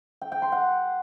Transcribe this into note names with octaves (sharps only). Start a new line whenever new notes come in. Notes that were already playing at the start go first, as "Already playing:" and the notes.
G5
G5
C6
F#5